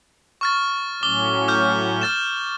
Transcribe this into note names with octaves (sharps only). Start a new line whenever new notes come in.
C#6 F6 A6
A2 F#3 C#4 D6 G7
D6 F6 G6
F6 A6 E7